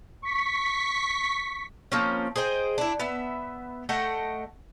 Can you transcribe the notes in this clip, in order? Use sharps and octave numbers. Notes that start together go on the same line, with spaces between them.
C#6 B6
F3 A#3 C4 C#4
G#4 C5 D#5 G5
D4 E4
B3 E5
A3 D#5 F#5 G5